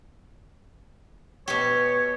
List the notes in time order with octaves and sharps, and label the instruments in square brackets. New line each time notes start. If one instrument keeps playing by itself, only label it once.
[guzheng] B2 G4 [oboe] C#5